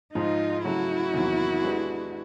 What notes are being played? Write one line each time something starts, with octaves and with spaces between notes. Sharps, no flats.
G#2 F3 G#3 D#4 F4
C#3 F#3 A3 E4 F#4
E2 C3 D#3 F#3 A#3
G#3 B3 D4 G4 B4